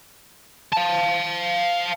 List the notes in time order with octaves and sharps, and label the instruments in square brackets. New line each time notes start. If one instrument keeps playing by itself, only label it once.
[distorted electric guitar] F5 A5